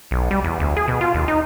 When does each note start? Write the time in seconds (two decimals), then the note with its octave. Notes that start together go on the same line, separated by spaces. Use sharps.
0.11 B1
0.31 G3
0.44 E2
0.60 D2
0.77 G#4
0.88 B2
1.01 F4
1.15 D#2
1.28 D#4